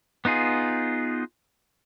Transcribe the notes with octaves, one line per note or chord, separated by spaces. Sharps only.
B3 D#4 F4 G#4